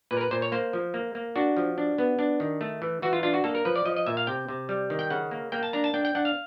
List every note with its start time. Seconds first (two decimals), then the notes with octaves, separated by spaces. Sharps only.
0.11 A#2 B4
0.17 A#4
0.21 B4
0.31 A#2 C5
0.42 C#5
0.52 A#3 C5
0.73 F3
0.94 A#3
1.15 A#3
1.36 D4 F#4
1.57 F3
1.78 D4
1.98 B3
2.19 D4
2.40 D#3
2.61 A3
2.82 E3
3.02 E3 F#4
3.13 F4
3.23 D4 F4
3.34 F#4
3.44 A#3 A4
3.55 A#4
3.65 F3 B4
3.76 D5
3.86 F3 D#5
3.96 D#5
4.06 A#2 E5
4.17 F5
4.27 C3 G5
4.49 C3
4.69 G3
4.90 D#3
4.99 G5
5.10 C#3 F#5
5.31 A#3
5.52 A#3 G5
5.63 A5
5.73 D4 A#5
5.84 A5
5.94 D4 G5
6.05 G5
6.15 D4 F#5
6.25 F5